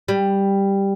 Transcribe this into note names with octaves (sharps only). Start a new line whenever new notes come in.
G3